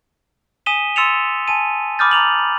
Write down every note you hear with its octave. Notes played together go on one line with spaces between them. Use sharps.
G#5 D#6 B6 D#7 E7 G7
C6 E6 A6 C#7 E7 F7
G#5 A5 D#7
B5 D6 D#6 F6 G6 A6
A#5 D6 F7 F#7
B5